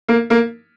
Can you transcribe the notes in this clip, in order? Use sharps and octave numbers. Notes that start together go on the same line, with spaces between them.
A#3
A#3